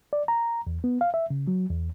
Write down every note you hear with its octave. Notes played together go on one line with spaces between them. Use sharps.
D5
A#5
E2
B3
F5
E5
C#3
F#3
E2